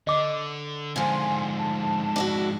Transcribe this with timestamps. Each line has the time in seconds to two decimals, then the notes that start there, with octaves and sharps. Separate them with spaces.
0.07 D3 D#5 D6
0.96 F2 G#2 D3 F3 G#5 C6
1.58 A5
2.16 D4 E4 F#4